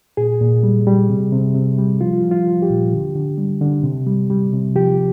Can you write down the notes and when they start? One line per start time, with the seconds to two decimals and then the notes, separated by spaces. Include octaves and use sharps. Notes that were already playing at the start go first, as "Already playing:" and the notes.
0.17 A#2 G#4
0.41 A#2
0.63 G3
0.87 G3
1.09 C3
1.32 C3
1.55 C3
1.78 G3
2.01 F3 F4
2.23 F3
2.31 F4
2.47 F3
2.62 G4
2.70 A#2
2.92 D3
3.15 D3
3.38 G3
3.61 D3
3.83 C3
4.07 G3
4.30 G3
4.53 C3
4.75 F3 G4